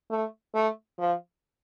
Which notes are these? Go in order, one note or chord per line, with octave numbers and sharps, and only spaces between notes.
A3
A3
F3